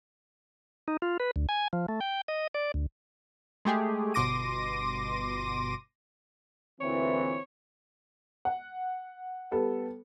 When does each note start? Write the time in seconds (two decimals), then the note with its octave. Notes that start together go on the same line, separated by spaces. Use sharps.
0.88 D#4
1.02 F4
1.20 B4
1.36 D2
1.49 G#5
1.73 F3
1.88 A3
2.01 G5
2.28 D#5
2.54 D5
2.74 D2
3.65 G#3 A3 G4 G#4
4.14 G1 B2 C6 D6 A#6 D#7
6.81 D2 A#2 E3 C4 C#5
8.45 F#5
9.51 G3 B3 A4